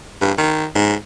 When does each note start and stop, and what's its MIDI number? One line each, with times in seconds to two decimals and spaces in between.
0.21 0.32 43
0.38 0.66 51
0.75 0.94 44